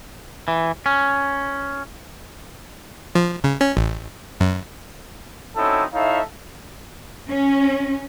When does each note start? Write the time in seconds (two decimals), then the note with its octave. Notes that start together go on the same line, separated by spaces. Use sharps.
0.48 E3
0.86 C#4
3.15 F3
3.44 C#3
3.61 C#4
3.77 A1
4.40 F#2
5.56 C4 C#4 D#4 E4 F#4 A4
5.93 D#4 E4 A4 C#5 E5 F5
7.29 C#4